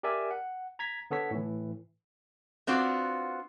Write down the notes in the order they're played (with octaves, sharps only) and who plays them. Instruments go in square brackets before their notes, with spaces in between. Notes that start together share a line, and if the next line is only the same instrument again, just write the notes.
[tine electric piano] G4 A#4 D5 E5 G#5
F#5
A#5 G#6 B6
D3 B3 A4 C#5 B6
A2 E3
[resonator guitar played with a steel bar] B3 C4 D4 F4 F#4